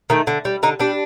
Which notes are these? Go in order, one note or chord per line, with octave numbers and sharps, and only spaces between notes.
D#3 A3
D3
G3
D3 D#4
G3 D4